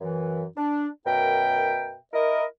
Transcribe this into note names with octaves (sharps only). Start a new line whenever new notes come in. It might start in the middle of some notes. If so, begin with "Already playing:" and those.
F#2 E3
D4
F#2 B2 A#4 E5 G5
E4 A#4 D#5